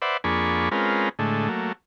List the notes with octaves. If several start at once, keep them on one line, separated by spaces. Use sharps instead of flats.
B4 C5 D5 E5 F#5
F2 A#3 D4 G#4 B5 C#6
G#3 C4 C#4 F4 A#4 B4
A2 D3 G#3 A3
F#3 A3 A#3